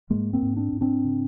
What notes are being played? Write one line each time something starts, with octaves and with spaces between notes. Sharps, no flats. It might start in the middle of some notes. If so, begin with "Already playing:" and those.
G#2 G#3 A#3
A#3 C4
G#2
C4 D4
G#2
C4 D4
C#3